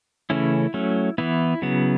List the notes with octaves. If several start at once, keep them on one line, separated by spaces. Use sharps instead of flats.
C#3 E3 A3 C#4 E4
F#3 A3 C#4
E3 B3 E4
C#3 F#3 B3